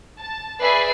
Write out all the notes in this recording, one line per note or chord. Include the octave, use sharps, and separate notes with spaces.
A5
G#4 B4 D5 E5 B5 C7